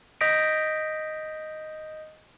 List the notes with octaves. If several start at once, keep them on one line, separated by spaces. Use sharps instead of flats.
D#5 D#6 G6 A#6 B6 D7